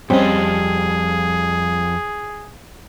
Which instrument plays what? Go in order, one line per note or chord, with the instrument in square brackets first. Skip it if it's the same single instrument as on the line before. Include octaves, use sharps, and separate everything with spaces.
[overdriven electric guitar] F2 D#5 [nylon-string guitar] G3 [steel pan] C4 C#4 [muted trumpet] G#4